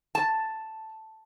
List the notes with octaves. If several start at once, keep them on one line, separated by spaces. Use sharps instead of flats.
A5